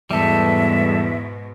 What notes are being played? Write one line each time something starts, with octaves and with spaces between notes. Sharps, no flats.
E2 G#2 B2 G3 A4 E5